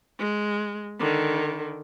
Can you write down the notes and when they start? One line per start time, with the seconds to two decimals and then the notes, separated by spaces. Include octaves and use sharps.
0.19 G#3
0.99 D3 D#3